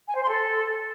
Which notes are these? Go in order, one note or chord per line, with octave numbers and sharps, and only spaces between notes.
G#5
C5
C6
A4